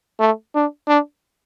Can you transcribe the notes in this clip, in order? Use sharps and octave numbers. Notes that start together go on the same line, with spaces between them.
A3
D4
D4